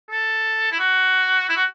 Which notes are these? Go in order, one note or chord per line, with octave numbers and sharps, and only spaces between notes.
A4
E4
F#4
E4
F#4